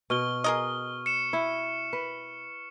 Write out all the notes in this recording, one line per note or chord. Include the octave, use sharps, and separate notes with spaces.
B2 C#6 F6 G7
G#4 A#4 D#5
C#7 E7
E4
B4